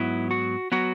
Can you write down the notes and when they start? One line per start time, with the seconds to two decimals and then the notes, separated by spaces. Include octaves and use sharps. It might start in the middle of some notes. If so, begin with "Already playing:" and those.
Already playing: G#2 F#3 B3 E4
0.31 F#4
0.72 F#3 B3 F#4